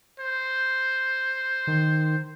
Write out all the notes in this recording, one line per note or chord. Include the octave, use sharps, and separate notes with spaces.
C5
D#3